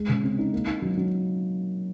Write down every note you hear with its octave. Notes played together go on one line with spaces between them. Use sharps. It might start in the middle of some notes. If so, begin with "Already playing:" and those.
Already playing: G#3
C#3
C4
D#4
A#3
D#4
F#3
F#3